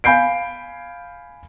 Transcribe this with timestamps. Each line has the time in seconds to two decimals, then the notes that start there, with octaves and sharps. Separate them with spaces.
0.04 F5 G#5 B5 G6 C7 D7